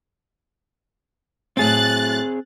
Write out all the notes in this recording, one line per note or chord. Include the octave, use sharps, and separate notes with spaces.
A2 F#3 A3 C4 G#4 F#6 A6